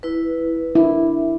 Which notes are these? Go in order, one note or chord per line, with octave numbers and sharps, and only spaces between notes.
E4 B4
D4 E4 A#4